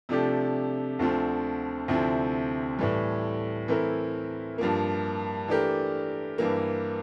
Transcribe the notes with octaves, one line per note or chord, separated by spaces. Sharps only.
C3 F3 A3 D4 G4
D2 D3 F3 A3 C4
D2 C3 F3 C4 E4
A2 E3 G3
E3 A3 C4 E4 A#4
G2 F3 A#3
E3 A3 D4 G4 A#4
G2 E3 A#3